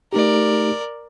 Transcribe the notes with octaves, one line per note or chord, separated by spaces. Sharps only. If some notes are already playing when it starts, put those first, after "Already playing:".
A3 D#4 G4 A#4 D5